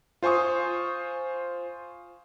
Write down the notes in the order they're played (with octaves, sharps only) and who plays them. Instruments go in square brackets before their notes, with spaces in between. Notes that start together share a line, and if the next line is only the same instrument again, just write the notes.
[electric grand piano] F4 C5 G#5 C#6 D#6